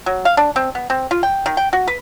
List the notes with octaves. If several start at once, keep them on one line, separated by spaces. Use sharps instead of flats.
F#3
F5
D4
C4
B3
C4
F4
G5
D#3
G5
F#4
B4